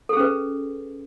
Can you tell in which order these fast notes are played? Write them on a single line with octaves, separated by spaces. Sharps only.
A4 G#4 C#4 B4